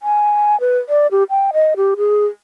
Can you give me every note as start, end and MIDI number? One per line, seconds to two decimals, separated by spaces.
0.02 0.59 80
0.60 0.78 71
0.89 1.07 74
1.11 1.23 67
1.30 1.51 79
1.53 1.74 75
1.76 1.94 67
1.97 2.25 68